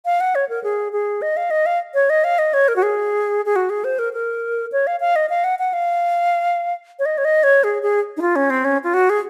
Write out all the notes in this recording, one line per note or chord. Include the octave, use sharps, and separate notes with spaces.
F5
F#5
C#5
A#4
G#4
G#4
D#5
F5
D#5
F5
C#5
D#5
F5
D#5
C#5
A#4
F#4
G#4
G#4
F#4
G#4
C5
A#4
A#4
C#5
F5
F5
D#5
F5
F#5
F#5
F5
C#5
D#5
C#5
D#5
C#5
G#4
G#4
D#4
F4
C#4
C4
C#4
F4
F#4
G#4